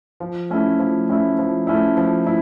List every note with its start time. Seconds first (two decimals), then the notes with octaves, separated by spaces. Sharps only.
0.20 F3
0.50 A3 C#4 E4
0.79 F3
1.09 A3 C#4 E4
1.39 F3
1.67 A3 C#4 E4
1.97 F3
2.27 E4